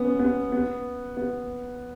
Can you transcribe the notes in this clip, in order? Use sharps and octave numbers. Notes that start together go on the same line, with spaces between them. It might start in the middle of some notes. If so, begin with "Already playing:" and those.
Already playing: B3 C#4
B3
B3
B3